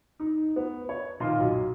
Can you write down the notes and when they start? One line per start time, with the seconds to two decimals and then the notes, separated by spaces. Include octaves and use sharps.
0.20 D#4
0.56 B3
0.89 C#5
1.20 A#2 D#3 F4 D#5 C6
1.39 B1